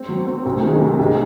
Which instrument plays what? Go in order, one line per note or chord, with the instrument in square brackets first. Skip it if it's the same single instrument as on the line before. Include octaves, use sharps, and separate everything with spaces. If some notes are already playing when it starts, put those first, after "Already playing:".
Already playing: [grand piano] G#3 [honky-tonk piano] C4
[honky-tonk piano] F#3
C4
[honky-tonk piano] C2 [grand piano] C4
[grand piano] A3
[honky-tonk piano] D#3 [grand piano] G#3
[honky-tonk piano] C3 [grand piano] A3
[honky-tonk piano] C2 [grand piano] G#3